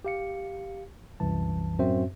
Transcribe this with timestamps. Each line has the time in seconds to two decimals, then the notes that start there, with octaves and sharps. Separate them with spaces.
0.05 G4 F5 C#7
1.20 C2 F#2 E3 A5
1.79 F#2 A2 C4 F#4 C5 E5